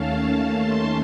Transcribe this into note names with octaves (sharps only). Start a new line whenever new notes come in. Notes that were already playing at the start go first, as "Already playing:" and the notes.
Already playing: D#2 D#3 A3 C#4 F5 A5
A5 C6